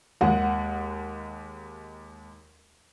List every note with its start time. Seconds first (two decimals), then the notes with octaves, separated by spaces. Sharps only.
0.21 D#2 G#3 F#5